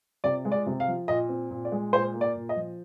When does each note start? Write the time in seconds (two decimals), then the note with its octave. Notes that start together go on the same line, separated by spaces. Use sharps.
0.24 C3 D5
0.45 G#3
0.52 D5
0.66 C3
0.80 F5
0.88 F3
1.08 A#2 D#5
1.29 C4
1.50 A#2
1.65 D5
1.72 G#3
1.93 A#2 C5
2.14 A#3
2.21 D5
2.35 A#2
2.49 D#5
2.56 F3